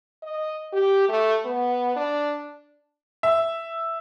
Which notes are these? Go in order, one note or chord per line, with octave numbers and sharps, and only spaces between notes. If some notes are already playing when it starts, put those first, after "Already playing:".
D#5
G4
A3
B3
D4
E5